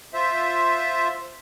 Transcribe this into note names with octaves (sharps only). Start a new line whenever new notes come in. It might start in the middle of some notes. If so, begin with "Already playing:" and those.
F4 C5 E5